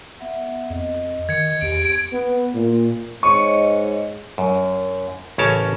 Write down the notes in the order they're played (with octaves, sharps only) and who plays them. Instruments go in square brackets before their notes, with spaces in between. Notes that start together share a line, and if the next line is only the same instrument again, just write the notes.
[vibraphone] B3 E5 F#5
[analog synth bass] F2 [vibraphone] D#5
[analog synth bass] D#3 [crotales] G#6 C#7
[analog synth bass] E2 [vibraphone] G4 [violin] D7
[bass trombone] B3
A#2
[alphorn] G#2 [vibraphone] C#5 D#5 [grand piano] C#6
[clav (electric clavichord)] F#2
A1 C#3 C#4 A#4 C#5 A5